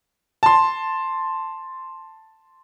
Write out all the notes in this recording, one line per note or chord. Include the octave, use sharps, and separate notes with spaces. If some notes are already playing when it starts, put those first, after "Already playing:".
A5 C6